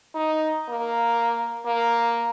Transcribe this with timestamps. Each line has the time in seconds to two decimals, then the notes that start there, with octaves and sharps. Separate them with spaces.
0.15 D#4
0.69 A#3
1.66 A#3